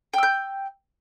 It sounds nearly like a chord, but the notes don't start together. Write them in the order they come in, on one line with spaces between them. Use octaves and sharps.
G5 E6 G6